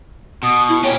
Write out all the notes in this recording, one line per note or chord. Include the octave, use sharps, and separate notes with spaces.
B2 D#6
E4
A#2 G4 C#5